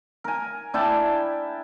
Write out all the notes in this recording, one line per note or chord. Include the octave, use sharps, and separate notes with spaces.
A#4 G#5
D4 E4 G5 A5